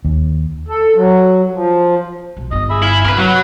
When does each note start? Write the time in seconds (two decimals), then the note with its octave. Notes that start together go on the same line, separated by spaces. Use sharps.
0.05 D#2
0.68 A4
0.96 F#3
1.53 F3
2.37 B1
2.51 G1 G2 D#5
2.70 G#4 E5 B5
2.82 E4 F5 G#5
3.05 C3 A#4 B4
3.17 F#3 F#4 B4